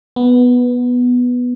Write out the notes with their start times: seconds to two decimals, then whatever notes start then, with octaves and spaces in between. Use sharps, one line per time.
0.16 B3